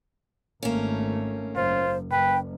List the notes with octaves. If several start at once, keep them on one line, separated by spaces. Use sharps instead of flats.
G#1 A3 A#3 C#4
F#1 F4 C5
F#1 B4 G5